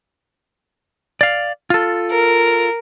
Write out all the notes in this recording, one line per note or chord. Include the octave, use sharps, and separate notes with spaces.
D5 F5
F4 A4
A#4